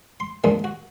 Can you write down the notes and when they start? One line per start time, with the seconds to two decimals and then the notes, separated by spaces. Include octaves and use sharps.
0.20 C6
0.44 D#3 F3 G#3 A#3 D4 D#4
0.64 F#4